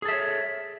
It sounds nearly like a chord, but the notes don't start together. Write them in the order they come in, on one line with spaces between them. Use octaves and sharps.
G#4 A4 E5 C#5